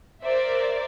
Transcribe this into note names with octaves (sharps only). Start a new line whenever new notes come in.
A#4 C5 D5 E5